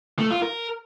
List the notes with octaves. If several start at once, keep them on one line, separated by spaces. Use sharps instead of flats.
A3
F4
A#4